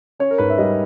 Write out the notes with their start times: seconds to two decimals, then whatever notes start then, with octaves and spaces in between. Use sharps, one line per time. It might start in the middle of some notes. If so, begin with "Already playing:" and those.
0.19 C#4 C#5
0.31 A#4
0.38 G#2 B4
0.50 E5
0.58 G3 D#5